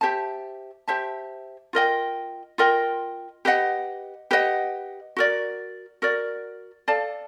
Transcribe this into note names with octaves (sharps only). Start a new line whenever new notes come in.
G4 C5 E5 A5
G4 C5 E5 A5
F4 A#4 D#5 G5
F4 A#4 D#5 G5
G4 B4 D#5 F#5
G4 B4 D#5 F#5
F#4 A#4 D5
F#4 A#4 D5
A4 D5 F5 A5